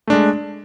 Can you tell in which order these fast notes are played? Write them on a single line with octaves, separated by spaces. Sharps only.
A3 D4 G#3